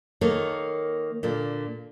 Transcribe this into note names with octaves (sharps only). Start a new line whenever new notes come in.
D#3 A#3 A4 C#5
A#2 D3